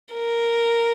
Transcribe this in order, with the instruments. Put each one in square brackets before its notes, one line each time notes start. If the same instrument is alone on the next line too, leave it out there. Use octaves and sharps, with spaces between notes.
[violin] A#4